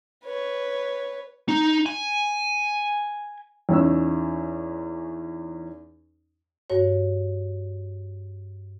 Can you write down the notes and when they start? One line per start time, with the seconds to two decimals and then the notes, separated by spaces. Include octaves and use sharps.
0.24 B4 C#5
1.49 D#4
1.86 G#5
3.69 E2 C#4 D#4 E6
6.70 G2 F#4 C#5